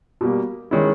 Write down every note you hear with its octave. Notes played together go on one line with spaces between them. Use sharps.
B2 G3 A#3
D#3 G#3 C#4 E4